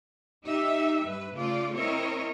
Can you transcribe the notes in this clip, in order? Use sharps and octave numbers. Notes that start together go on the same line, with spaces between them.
D#4 G4 E5
G2 B4
C#3 A3 F4 D5
C4 E4 A#4 C#5 D#5 E5